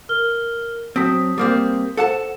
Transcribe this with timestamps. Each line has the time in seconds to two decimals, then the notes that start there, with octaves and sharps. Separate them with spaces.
0.09 A#4 F6 G7
0.96 F#3 C4 A5 D#6 B6
1.38 G3 A#3 C4
1.97 A4 C5 F#5 A5 E7